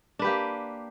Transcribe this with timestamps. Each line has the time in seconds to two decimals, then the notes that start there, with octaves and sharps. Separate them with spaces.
0.19 D4
0.22 B4
0.24 G4
0.27 A#3